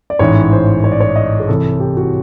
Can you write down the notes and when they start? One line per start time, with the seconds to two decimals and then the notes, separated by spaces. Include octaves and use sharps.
0.10 D5
0.19 A1 G#2 E3 C#5
0.52 C5
0.84 C#5
0.92 D5
1.00 C#5
1.16 D#5
1.40 G#4
1.48 C2 C3 E3 A4
1.80 G4
1.97 F#4